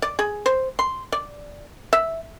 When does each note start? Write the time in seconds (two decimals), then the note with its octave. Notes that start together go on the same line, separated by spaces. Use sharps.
0.02 D5
0.19 G#4
0.46 C5
0.79 C6
1.12 D5
1.93 E5